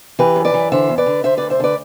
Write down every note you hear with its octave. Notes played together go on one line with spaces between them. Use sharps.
E3 G4 B4
F#2
B4 D5
E3
D3 C5 E5
E2
B4 D5
D3
D3 C5 E5
D2 B4 D5
C5 E5
D3 B4 D5